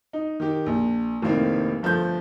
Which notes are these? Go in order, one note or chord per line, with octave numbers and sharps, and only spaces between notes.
D#4
D#3 G4
A#1
F1 A2 D#3 A#3 C4
G1 F3 A3 G6